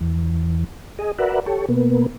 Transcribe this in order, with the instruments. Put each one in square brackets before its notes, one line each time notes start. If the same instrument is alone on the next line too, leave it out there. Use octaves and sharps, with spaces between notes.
[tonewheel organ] E2
G#4 D#5
F#4 A#4 B4 D5 E5 F#5
G4 A4 C#5
B2 A#3 B3